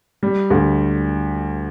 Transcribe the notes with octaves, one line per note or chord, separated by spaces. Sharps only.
G3
D2